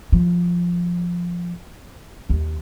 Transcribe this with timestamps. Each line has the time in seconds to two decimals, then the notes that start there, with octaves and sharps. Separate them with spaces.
0.12 F3
2.29 D#2